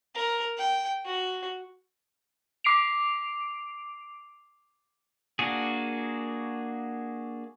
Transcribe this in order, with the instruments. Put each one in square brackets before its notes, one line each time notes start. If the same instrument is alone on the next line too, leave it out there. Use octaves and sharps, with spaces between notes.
[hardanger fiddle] A#4
G5
F#4
[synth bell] D6 C7 D7 F7
[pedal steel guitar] A#3 D4 F#4 G#4